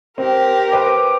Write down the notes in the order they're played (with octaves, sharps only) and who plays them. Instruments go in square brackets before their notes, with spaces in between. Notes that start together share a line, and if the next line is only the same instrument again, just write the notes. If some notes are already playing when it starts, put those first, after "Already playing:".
[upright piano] C4 [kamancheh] G4 A#4
[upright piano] B4 C5 G5 [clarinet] D6